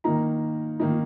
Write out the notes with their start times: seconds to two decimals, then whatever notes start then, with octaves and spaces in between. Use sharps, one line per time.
0.04 D#3 A#3 D#4 A#5
0.80 D#3 A#3 D#4